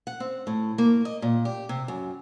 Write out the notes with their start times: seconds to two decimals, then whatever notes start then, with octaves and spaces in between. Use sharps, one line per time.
0.07 F#5
0.20 C4
0.47 A2
0.78 A#3
1.05 D#5
1.22 A#2
1.45 G4
1.69 C3
1.88 F#2